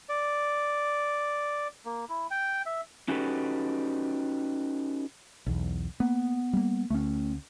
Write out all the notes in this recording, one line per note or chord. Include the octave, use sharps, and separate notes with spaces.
D5
A#3
E4
G5
E5
C#4 D#4 F#4 G4 A4 B4
B1 E2
A#3 B3
G3 A#3
D2 A3 C#4